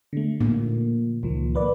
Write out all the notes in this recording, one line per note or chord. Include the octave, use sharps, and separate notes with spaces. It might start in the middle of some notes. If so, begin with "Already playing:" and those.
D3 A3
A#2
C#2 D#3 F3
A#3 B4 D5